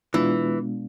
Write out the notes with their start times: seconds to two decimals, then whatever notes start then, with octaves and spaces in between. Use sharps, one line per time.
0.14 B2 E3 G#3 B3 D4 F4